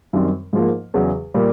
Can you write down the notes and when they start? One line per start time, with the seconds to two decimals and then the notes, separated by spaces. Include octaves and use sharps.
0.13 F#2 D#3 G3 C4
0.53 G#2 F3 A#3
0.94 E2 C#3 F#3
1.34 A#2 G3 A#3